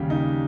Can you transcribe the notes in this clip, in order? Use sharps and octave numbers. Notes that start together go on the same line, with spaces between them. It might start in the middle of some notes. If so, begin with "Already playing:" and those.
Already playing: D#2 C#3 G3 G4
D#4